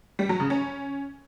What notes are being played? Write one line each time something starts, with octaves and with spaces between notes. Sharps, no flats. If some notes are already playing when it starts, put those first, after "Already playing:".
G3
F#3
C#3
C#4